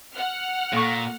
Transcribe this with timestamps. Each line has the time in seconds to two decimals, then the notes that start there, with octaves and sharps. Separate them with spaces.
0.14 F#5 F6
0.73 A#2 A#3 A4 C#6